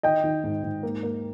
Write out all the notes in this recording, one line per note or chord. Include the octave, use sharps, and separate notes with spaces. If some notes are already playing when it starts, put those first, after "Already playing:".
D#3 D#5 G5
D#3
G#2
G#2
A#3
A#3